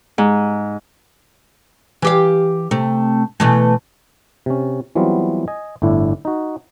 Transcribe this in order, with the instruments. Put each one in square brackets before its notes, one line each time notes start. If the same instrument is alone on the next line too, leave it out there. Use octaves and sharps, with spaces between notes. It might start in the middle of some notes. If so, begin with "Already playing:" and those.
[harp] G#2
[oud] E3 G4 F5
C3 A3
B2 E3 A3
[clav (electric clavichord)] C3 C#4
E3 F#3 G3 B3 C4 F4
D#5 G#5
G1 A2 D4 E4
D#4 F#4